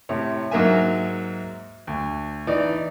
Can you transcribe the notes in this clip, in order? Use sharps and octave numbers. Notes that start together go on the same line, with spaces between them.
A2 C3 C#5
G#2 F#3 A#3 A#4 E5 G#5
D2
E3 D#4 D5